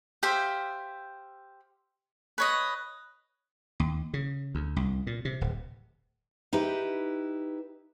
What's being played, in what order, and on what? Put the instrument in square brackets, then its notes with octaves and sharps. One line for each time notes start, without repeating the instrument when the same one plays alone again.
[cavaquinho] G4 C5 E5 F5
B4 C#5 D#5
[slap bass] D#2
C#3
D2
C2
A#2
C3
D1
[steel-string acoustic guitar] D#4 E4 G4 B4